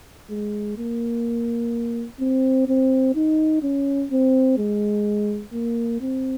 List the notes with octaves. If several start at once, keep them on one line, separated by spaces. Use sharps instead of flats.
G#3
A#3
C4
C4
D#4
C#4
C4
G#3
A#3
C4